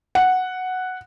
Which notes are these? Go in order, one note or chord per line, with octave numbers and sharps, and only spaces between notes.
F#5